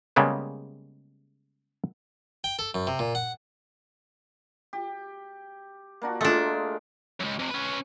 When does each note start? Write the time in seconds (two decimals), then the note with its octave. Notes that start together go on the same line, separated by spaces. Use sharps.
0.16 C#3 G3 G#3 A#3 B3
2.44 G5
2.59 A4
2.74 F#2
2.87 C3
2.99 A#2
3.15 F#5
4.73 G4
6.02 A#3 D4 F#4
6.21 G#3 A3 D4 F4 G#4
7.20 C#2 F#2
7.39 F2 C3
7.50 C#4 B4